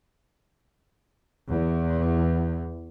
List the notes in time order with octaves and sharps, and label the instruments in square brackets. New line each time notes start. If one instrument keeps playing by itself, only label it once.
[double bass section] E2